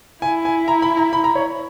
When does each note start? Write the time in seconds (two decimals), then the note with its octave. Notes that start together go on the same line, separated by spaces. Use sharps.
0.22 E4 G#5
0.45 G#5
0.68 A#5
0.82 B5
0.97 A#5
1.13 B5
1.24 A#5
1.35 C#5